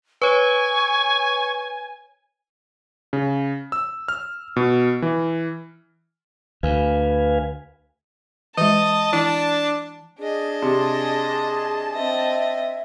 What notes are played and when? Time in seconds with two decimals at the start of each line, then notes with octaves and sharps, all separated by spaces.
0.22 B4 C#5 G#5 C#6
3.13 C#3
3.72 E6
4.08 F6
4.56 B2
5.02 E3
6.63 D2 B4 F5 G#5
8.57 E3 G#3 D#5 A5
9.13 E3 D4 E4
10.19 D4 G#4 D#5
10.62 C3 A5
11.94 C4 D#5 E5